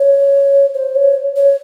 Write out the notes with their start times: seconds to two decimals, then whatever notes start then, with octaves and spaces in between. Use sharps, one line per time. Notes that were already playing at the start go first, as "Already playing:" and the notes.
Already playing: C#5
0.74 C5
0.95 C#5
1.36 C#5